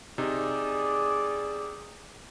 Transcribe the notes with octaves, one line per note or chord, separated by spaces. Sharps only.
C3 D#4 G#4 D5